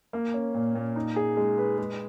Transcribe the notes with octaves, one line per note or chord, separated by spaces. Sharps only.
A#3
C#4
A#2
A#2
D#4
G#4
G#3
B4
G#3